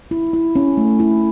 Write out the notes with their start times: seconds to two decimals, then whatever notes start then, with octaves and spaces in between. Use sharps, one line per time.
0.11 E4
0.33 E4
0.56 C#4
0.77 A3
1.00 E4